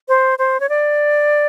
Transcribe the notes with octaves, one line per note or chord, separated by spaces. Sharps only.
C5
C5
C#5
D5